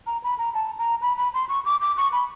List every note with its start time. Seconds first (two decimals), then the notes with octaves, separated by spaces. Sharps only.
0.07 A#5
0.24 B5
0.39 A#5
0.54 A5
0.79 A#5
1.02 B5
1.18 B5
1.34 C6
1.49 C#6
1.65 D6
1.81 D6
1.97 C#6
2.12 B5